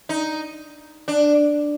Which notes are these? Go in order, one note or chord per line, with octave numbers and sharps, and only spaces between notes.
D#4
D4